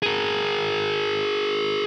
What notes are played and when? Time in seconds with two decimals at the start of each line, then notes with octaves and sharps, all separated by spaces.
0.03 G#4 A#4